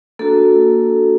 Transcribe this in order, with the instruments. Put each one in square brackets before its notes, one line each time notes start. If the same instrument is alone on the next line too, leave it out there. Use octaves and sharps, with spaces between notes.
[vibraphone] A#3 D4 F#4 A4